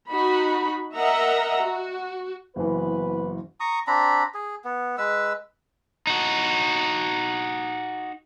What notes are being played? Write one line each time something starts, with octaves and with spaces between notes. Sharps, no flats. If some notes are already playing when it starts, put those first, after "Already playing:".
D#4 F#4 B5
A#4 D#5 E5 F#5 A#5
F#4
F#1 E3 B3 B4
A#5 C#6 D#6
C4 D4 A#5 B5
G#4
B3
G#3 B4 E6
D#4 F#4